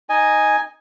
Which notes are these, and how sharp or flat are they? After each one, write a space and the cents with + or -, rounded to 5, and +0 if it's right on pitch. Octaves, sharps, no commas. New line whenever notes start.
D#4 +0 D#5 +0 G#5 +0